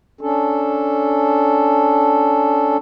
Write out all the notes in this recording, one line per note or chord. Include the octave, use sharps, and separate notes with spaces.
C#4 D4 A4